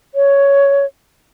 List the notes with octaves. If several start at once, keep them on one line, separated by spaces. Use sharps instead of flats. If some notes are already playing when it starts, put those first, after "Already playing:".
C#5